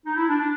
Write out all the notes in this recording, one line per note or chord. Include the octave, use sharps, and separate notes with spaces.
D#4
E4
D4
D4